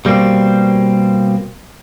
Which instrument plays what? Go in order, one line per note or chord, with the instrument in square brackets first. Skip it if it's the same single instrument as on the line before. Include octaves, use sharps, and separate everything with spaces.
[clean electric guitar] B2 G3 A#3 C4